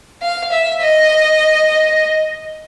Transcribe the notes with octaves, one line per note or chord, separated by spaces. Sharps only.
F5
E5
D#5